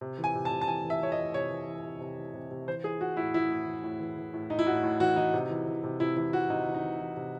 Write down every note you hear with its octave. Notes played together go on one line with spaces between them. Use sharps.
C3
E3
G#5
C3
A5
C3
A5
E3 G#5
E3
E5
E3 C#5
D#5
E3
C3 C#5
E3
E3
C3
C3
E3
C3
C3
E3 C5
E3 G#4
E3 F#4
A2 E4
E3 E4
A2
E3
A2
E3
E3
A2
A2 D#4
E4
A2 F#4
A2
E3 F#4
E3 D#4
C3
E3
E3
C3
C3 E4
E3 E4
E3 F#4
C3 D#4
E3
D#4
E3
E3
C3